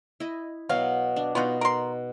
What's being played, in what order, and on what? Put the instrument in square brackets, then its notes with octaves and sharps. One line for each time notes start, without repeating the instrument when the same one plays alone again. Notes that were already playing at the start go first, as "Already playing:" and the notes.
[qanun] E4 D#5
[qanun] B2 F#3 [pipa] F5
[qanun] D4
[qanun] B2 D#4 [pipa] B3 F4 F#4
[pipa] A#4 C6